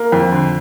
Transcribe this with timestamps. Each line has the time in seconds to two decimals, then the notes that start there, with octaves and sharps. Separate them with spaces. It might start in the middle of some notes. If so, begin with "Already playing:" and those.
Already playing: A#3
0.12 F2
0.32 D3